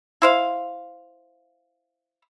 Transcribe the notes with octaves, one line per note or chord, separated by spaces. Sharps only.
E4 C5 F5